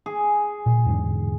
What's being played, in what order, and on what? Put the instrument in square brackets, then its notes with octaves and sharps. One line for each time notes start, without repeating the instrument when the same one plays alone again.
[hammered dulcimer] G#4
[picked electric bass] A#2
E2 G#2 D3